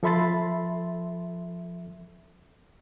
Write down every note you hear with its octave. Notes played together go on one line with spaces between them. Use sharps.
F3 A4 E5 B5 C6 A6